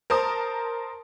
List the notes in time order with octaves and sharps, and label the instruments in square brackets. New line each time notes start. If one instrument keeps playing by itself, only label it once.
[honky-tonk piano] A#4 C5 A5 D#6